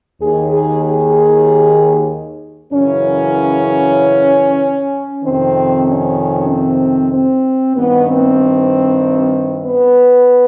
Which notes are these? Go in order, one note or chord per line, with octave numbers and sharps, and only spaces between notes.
D#2 D#3 G#4
G#4
G#4
F#2 C#3 E3 C#4
F2 C3 D#3 C4
C#4
C4
C4
G2 D#3 B3
C4
B3